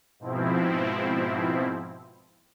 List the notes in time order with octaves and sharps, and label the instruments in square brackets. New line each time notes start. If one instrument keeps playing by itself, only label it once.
[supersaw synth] G#2 B2 F3 C4 E4